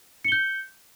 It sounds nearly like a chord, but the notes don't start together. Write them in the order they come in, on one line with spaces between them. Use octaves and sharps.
C#7 G7 G6